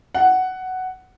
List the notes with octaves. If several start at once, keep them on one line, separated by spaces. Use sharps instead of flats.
F#5